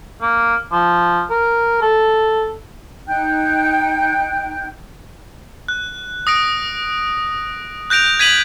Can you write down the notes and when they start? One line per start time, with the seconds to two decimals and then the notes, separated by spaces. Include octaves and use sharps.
0.22 A#3
0.72 F3
1.31 A#4
1.82 A4
3.07 D#4 G5 F#6 G6
5.68 F#6
6.27 D#6 A#6 D7
7.90 F#6 G6 A#6 D7 F7
8.19 G#6 B6 D#7 F7 F#7